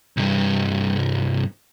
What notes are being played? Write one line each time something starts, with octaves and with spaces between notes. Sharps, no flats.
C2 G2